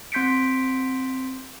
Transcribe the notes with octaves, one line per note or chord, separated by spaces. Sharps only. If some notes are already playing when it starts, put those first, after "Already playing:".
C4 C6 G6 B6 C#7 D7